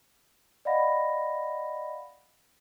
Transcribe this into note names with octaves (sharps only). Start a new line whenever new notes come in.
D5 D#5 F5 F#5 B5 A#6